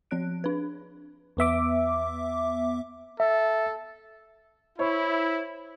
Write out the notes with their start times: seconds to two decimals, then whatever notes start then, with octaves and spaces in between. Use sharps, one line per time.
0.11 F3 C4 C#5 F#6 D7
0.44 D4 B4
1.37 E2 B3 E5 D6
3.20 A4 E5
4.79 E4 C5 C#5 C#6